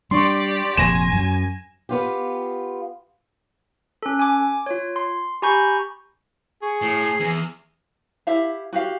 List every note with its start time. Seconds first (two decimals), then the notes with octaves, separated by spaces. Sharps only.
0.11 G3 D4 G4 D5 C6 C#6
0.77 F1 F2 A#2 G#5 A#6 E7
1.12 F#2
1.89 B3 F4 G4
4.02 C#4 A4
4.19 G#5 D6
4.66 F4 C#5
4.96 C6
5.42 G4 G#5 A#5 B5 C#6 G6
6.62 G#4 C#6
6.82 A2 C7
7.20 E2
8.27 E4 G4 E5 F5
8.73 F#4 G4 F5